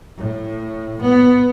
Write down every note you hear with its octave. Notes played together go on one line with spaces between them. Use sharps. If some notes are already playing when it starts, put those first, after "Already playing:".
A2
B3